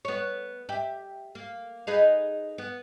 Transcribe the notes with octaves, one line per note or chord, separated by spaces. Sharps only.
B3 C#5
G4 E5
A#3
D#4 G#4 B4
B3